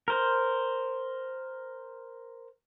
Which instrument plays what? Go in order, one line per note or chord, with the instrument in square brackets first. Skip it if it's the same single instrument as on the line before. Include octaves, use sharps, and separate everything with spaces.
[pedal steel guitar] A#4 C5